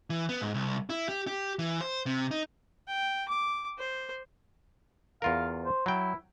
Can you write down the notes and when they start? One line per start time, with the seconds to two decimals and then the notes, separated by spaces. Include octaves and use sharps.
0.10 E3
0.29 B3
0.41 G#2
0.54 C2
0.90 E4
1.09 G4
1.27 G4
1.59 E3
1.81 C5
2.06 C3
2.31 D#4
2.88 G5
3.28 D6
3.78 C5
5.22 E2 F4 A#4 F5
5.65 C5
5.86 F#3 E4 G5